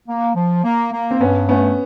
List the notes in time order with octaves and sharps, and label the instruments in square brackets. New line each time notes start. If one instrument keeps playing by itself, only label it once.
[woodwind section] A#3
F3
A#3
A#3
[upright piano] C4
[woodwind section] G2 [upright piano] B3 C#4
[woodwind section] A3 [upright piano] B3 C#4